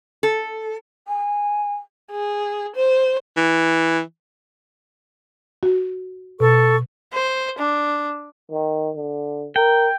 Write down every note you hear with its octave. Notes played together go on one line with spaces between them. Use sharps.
A4
G#5
G#4
C5
E3
F#4
B2 A4 C#6
C5
D4
D#3
D3
A#4 G5